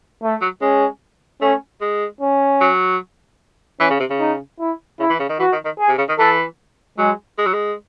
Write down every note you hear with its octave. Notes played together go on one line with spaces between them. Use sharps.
A3
F#3
G#3 C#4
A3 C#4
G#3
C#4
F#3
E3 C#4
C#3
C3
C#3
D#4
E4
C#3 E4
E3
C#3
D#3
E3 F#4
D#3
D#3
G#4
C3
C#3
D#3
E3 A4
F#3 G#3
G#3
F#3
G#3